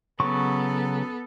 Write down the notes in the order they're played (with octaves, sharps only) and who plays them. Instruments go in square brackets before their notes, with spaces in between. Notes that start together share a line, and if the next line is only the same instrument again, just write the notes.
[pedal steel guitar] C#3 F#3 C#6 [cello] B3 A4